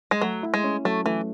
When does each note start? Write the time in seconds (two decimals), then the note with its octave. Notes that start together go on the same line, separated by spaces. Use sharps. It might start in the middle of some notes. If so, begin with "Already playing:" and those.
0.11 G#3
0.21 F#3 A3
0.43 E4
0.54 G#3
0.64 C#4
0.85 F#3 A3
1.06 E3 A3